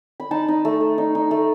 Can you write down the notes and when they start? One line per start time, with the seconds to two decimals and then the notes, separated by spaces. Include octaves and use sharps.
0.20 B5
0.31 D#4 A5
0.48 D#4
0.65 A3
0.81 A3
0.98 D#4
1.15 D#4
1.31 A3